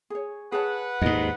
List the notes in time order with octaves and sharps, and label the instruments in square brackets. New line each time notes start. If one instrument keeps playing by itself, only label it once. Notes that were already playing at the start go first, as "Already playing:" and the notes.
[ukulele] G#4 C#5
[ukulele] G#4 C#5 A5 [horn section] B4 F#5
[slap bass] D#2 G#2 [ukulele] D#4 D#5